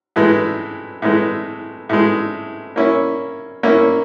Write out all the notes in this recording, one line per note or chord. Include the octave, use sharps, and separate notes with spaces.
A2 E3 G#3
A2 E3 G#3
A2 E3 G#3
A#3 C#4 E4
A#3 C#4 E4